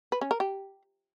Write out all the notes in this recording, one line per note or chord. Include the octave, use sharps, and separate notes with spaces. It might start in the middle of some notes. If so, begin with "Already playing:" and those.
B4
C#4
A#4
G4